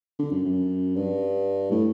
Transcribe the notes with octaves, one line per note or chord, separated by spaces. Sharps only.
D3
F#2
F#2
G2
A2